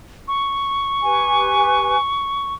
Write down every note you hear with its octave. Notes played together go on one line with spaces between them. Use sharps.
C#6
G4 B4 G#5